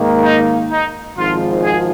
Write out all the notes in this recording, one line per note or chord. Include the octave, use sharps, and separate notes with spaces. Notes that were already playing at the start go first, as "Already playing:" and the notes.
Already playing: G#2 D#3 A#3
D#4
D#4
G#1 G#2 F3 F4
G#4